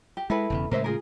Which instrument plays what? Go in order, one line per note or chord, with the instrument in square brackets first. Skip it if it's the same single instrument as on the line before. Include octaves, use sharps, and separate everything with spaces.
[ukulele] G4
[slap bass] G#3 [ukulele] E4 A4 B4
[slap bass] E1 E2 C#3
[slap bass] A2 C#3 G#3 [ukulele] A#4 C5 E5
[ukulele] F4 G#4 A#4